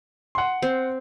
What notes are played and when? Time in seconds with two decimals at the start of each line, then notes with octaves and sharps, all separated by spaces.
0.35 F#5 C6
0.62 C4